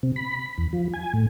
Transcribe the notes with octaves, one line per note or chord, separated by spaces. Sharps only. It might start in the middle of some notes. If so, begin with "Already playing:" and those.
C3
B5
E2
F3
G#5
A2